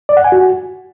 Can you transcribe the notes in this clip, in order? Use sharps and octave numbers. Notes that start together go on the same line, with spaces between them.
D5
F#5
G#5
F#4